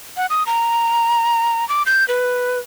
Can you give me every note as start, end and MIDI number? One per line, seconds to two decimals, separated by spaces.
0.17 0.26 78
0.30 0.46 87
0.47 1.67 82
1.69 1.83 86
1.86 2.06 91
2.08 2.60 71